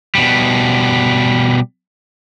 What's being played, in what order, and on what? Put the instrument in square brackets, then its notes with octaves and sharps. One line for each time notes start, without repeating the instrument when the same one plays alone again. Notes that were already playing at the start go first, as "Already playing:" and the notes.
[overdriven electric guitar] B2 G3